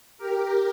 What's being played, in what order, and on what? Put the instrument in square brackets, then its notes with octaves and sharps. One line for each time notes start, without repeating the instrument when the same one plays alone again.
[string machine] G4 A#4